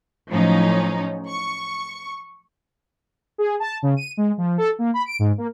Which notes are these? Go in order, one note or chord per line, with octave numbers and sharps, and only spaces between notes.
A2 F3 F#3 C#4 D#4
C#6
G#4
A5
C#3
D#7
G#3
F3
A4
A#3
B5
D7
G#2
A#3